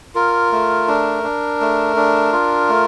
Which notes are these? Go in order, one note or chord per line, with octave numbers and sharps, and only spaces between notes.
F4 A#4
A3
D4
D4
A3
D4
F4
A3